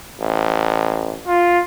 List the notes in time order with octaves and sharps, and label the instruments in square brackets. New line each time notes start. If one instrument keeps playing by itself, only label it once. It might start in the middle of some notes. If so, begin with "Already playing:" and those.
[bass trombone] A1
[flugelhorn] F4